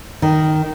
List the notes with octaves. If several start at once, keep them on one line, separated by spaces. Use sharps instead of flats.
D#3